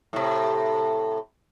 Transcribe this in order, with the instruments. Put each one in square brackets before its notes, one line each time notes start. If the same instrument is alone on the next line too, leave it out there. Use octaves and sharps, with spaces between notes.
[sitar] A2 C3